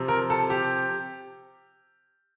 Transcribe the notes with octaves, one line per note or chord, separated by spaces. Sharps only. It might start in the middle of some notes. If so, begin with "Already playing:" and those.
Already playing: C3 F3
A#4
A4
G4